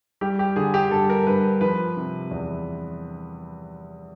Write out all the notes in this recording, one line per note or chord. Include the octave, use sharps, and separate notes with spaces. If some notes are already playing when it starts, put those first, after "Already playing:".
G3 G4
G4
D3 G#4
G4
G2 A4
A#4
G2 B4
F3 B4
C3
E2